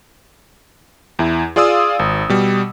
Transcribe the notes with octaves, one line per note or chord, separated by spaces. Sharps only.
E2 E4
F4 G#4 D5 F5 D#6 E6
G#1
B2 G3